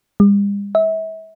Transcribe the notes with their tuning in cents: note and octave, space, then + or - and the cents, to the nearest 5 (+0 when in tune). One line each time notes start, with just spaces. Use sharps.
G3 +45
E5 -35